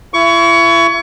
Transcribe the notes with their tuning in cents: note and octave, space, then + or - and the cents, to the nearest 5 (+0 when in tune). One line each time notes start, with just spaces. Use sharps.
E4 +35 C#6 +25